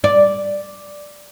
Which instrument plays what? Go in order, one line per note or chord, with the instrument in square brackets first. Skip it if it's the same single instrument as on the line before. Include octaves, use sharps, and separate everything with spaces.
[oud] D5